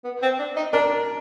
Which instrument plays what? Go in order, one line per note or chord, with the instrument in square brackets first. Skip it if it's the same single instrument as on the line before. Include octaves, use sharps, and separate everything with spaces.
[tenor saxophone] B3
C4
D4
D#4
[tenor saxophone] D4 [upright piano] A#4